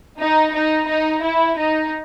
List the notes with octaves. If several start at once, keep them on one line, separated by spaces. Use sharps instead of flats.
D#4
D#4
D#4
E4
D#4